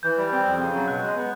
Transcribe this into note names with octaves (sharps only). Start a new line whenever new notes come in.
E3 G6
G3
C4
F2
C#3
F#3
B2 F#6
G#3
B3